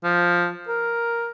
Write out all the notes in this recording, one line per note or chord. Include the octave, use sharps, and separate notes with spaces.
F3
A#4